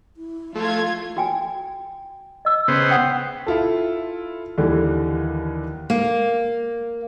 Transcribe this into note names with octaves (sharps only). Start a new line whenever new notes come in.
E4
F3 A3 F4 G#6
F#4 G5 G#5
D#5 E6
C#3 B3 C5
F#5 G5 D#6
E4 F4 A4
D#2 D3 E3 G3
A#3